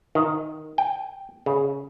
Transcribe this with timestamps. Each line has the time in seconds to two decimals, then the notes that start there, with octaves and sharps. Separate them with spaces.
0.15 D#3
0.78 G5
1.46 C#3